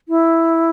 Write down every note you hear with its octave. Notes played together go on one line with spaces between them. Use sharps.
E4